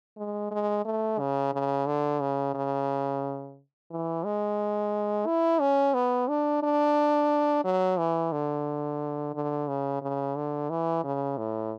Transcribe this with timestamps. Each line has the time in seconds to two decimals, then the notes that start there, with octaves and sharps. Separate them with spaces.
0.17 G#3
0.51 G#3
0.85 A3
1.19 C#3
1.53 C#3
1.86 D3
2.21 C#3
2.54 C#3
3.91 E3
4.25 G#3
5.26 E4
5.61 C#4
5.94 B3
6.28 D4
6.63 D4
7.64 F#3
7.98 E3
8.32 D3
9.34 D3
9.68 C#3
10.02 C#3
10.36 D3
10.70 E3
11.04 C#3
11.38 A2